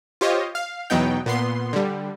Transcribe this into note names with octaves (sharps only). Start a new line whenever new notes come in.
F4 G4 C5 C#5 D#5
F5
E2 B2 F#3 B3 D#4 G5
A#2 B3 C6
D3 G3